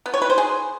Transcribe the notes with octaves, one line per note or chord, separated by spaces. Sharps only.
B3
C#5
B4
C5
G#4